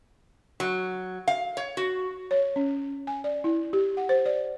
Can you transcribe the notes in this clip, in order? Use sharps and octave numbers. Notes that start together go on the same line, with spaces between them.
F#3
F5
C#5
F#4
C#5
C#4
G#5
D5
E4
G4
F#5
C5
D5